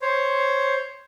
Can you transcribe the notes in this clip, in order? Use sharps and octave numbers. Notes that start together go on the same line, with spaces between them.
C5 C#5